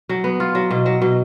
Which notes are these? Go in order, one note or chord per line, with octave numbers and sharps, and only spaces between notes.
F#3
B3
F4
F#3
B2
F#3
B2